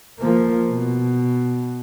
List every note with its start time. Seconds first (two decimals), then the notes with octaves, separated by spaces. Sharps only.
0.19 F3 A#3
0.69 B2